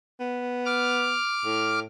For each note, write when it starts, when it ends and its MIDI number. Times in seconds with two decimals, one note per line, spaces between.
0.20 1.18 59
0.65 1.79 86
0.65 1.79 89
1.45 1.84 45